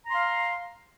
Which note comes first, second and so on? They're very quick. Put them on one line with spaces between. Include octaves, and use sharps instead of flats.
A#5 C6 F5